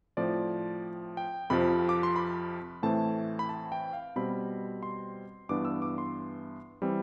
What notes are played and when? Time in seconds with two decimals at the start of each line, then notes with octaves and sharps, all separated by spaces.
0.17 A2 F3 C4 D5
1.17 G5
1.50 F2 C3 F3 B5
1.89 D6
2.03 C6
2.16 B5
2.83 A2 E3 A3 C4 A5
3.39 B5
3.49 A5
3.72 G5
3.93 F5
4.16 B2 G3 C4 B5
4.83 C6
5.49 G2 E3 B3 D4 D6
5.65 E6
5.82 D6
5.98 C6
6.82 E3 G3 C4